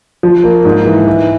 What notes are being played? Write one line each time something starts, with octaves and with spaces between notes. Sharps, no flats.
F3
A#3
G#2
E3
E3